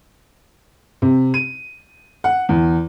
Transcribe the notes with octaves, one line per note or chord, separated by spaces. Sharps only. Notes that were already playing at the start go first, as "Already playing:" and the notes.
C3
D#7
F#5
E2